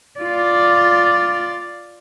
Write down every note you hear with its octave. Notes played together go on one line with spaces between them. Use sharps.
F4 D5